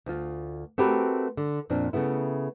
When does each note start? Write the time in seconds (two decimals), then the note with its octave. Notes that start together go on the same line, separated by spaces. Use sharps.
0.06 D2 F4
0.78 A3 C4 F#4 G4 A#4 B4
1.37 D3
1.70 F2 A#2 C4 D4
1.93 C#3 A3 B3 E4